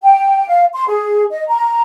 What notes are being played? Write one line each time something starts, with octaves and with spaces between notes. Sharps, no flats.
G5
F5
C6
G#4
D#5
A#5